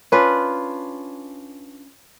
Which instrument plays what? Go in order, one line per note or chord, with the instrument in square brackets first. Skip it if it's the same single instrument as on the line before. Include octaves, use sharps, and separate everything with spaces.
[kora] C#4 D4 F4 B4